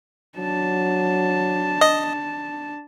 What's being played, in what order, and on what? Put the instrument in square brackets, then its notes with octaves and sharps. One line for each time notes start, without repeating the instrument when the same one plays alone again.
[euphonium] F#3 [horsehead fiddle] D4 A5
[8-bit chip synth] D#5